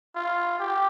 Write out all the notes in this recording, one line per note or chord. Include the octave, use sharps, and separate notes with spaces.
F4
G4